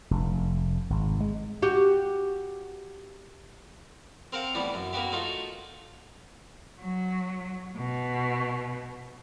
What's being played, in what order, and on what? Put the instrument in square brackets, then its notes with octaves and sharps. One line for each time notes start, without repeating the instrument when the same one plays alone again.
[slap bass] F1
G#1
G#3
[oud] F#4 G4
[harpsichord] C4 A#4 C5 F5 F#5
A2 E3 G3 B3 E4
F#2
A#3 B3 F#4 G4
A3 D#4 F4 F#4
[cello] F#3
B2